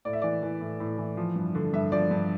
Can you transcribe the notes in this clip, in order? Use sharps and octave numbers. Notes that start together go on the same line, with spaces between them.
A2 D5
E5
E3 D5
E3
A2
A2
E3
F3
G2
D3
G2 E5
F3 D5
G2